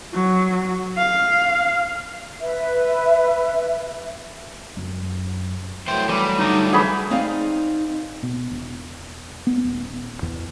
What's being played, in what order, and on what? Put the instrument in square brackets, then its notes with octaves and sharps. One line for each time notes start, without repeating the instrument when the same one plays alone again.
[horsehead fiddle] F#3
F5
[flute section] B4 E5
[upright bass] F#2
[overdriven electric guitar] E3 C5 [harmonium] F#3 A3 [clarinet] G5
[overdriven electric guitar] E3 [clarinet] G3 [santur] D6
[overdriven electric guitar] G2 D3 [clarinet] D#4
[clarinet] E3 [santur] G#4 B5
[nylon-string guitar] C4 D#4 G#4 D5 F5
[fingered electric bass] B2
E1
B3
D#1
E2